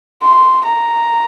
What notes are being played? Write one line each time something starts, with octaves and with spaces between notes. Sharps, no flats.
C6
A#5